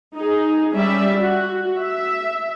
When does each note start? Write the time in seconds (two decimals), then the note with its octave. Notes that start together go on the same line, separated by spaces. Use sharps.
0.16 D#4 G#4
0.74 G3 C#4 D5 E5
1.17 F#4
1.78 E5